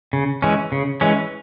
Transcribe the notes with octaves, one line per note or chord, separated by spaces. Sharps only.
C#3
E3 G#3 C#4
C#3
E3 G#3 C#4